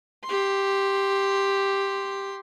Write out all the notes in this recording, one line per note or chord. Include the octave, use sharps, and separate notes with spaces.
G4 C6